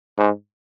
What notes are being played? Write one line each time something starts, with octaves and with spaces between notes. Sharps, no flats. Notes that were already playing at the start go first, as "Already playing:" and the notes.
G#2